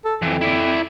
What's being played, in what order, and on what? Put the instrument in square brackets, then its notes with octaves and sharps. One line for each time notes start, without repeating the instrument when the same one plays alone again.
[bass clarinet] A4
[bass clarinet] F2 [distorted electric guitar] E3 F3
[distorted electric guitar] E4 D5